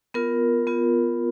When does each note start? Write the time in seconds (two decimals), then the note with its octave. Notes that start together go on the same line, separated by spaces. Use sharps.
0.14 B3 F4 A#4
0.67 B3 F4